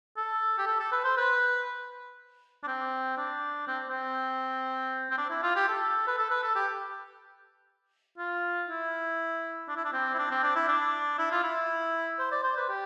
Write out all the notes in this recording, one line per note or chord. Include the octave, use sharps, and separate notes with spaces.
A4
G4
A4
A4
B4
C5
B4
D4
C4
D4
C4
C4
C4
D4
E4
F4
G4
A4
B4
A4
B4
A4
G4
F4
E4
D4
E4
D4
C4
E4
D4
C4
D4
E4
D4
E4
F4
E4
C5
D5
C5
B4
G4